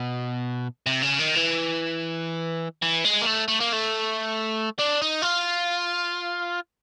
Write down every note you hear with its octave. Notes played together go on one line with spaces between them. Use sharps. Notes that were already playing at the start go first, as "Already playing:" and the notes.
Already playing: B2
C3
C#3
D#3
E3
E3
G#3
A#3
A3
A3
A#3
A3
D4
D#4
F4